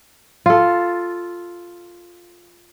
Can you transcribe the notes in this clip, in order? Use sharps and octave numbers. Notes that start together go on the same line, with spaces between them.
F4 A4